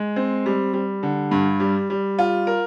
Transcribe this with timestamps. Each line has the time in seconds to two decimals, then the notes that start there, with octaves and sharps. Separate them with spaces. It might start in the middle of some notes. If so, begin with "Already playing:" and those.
Already playing: G#3
0.16 C4
0.46 G3
0.73 G3
1.03 D3
1.31 G2
1.60 G3
1.90 G3
2.19 F4
2.47 A#4